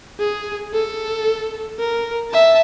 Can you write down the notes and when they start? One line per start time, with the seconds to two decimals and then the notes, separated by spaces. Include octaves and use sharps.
0.20 G#4
0.73 A4
1.79 A#4
2.31 E5 A5